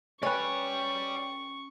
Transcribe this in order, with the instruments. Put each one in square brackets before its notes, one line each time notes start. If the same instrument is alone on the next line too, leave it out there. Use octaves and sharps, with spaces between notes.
[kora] C#4 B4 [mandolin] C#5 [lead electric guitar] D5 G5 [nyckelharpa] C#6